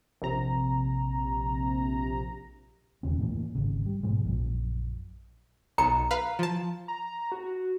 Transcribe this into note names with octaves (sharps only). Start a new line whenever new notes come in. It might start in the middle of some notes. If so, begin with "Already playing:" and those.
A#1 C3 A#5
E1 D#2 C#3 C#4
A2 E3 A#3
G#1 C#3
G3
G#2 B2 F3 G#3
A#1 F#2 A#2
B1 A#5 C#7
B4 F5
F3 A5
A#5
F#4